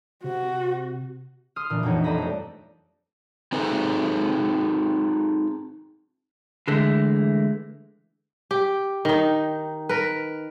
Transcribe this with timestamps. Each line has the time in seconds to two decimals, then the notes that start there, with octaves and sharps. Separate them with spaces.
0.24 C3 F#4
1.56 C6 D#6 F6
1.70 A#2 E3 D4
1.83 F2 B2 E3 A3 D#4 C#5
2.04 B4 C5 D5 D#5 A#5 B5
2.18 G3 A3
3.52 C4 D#4 G#4 A4 B4
6.68 D3 E3 G#3 A3
8.51 G4
9.05 D#3 D#4
9.89 A#4 B4